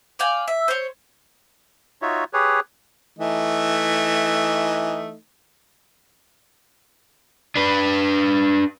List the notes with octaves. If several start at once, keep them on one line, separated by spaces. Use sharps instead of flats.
D5 F5 G5 G#5
E5
C5 C#5
D#4 F4 F#4 C#5 E5
G4 G#4 B4 C#5
E3 A3 D#4
D4 B4